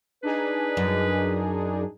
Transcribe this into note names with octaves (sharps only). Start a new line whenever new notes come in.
D4 D#4 G#4 B4
F#2